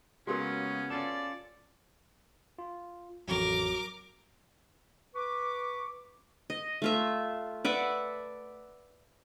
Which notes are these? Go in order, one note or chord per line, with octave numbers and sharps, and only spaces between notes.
C#3 G#3 A#3 B3 C#4 F#4 G4 A#4
C#4 F4 A4 D5
F4
A1 F2 F#3 A#4 D6
B4 C#6 D6
D#5
A3 F4 E5
B4 D5 E5 F#5